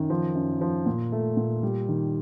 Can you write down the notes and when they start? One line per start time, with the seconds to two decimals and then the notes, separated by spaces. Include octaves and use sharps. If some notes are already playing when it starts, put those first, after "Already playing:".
Already playing: F#2 D#3
0.10 F3
0.35 F#2
0.61 F3
0.86 A#2
1.12 A3
1.37 A#2
1.63 G3
1.88 D#3